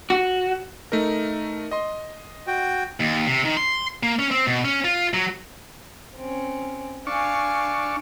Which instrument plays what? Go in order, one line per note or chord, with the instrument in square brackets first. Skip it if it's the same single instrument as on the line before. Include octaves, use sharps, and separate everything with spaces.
[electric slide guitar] F#4
[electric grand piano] A3 D#4 A#4
D#5 C6
[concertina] F#4 G5
[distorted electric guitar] D#2
C3
D#3
C6
A#3
C#4
C4
B2
C#4
F4
F#3
[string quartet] C4 C#4
[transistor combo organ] D4 C#6 [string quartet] F5 G#5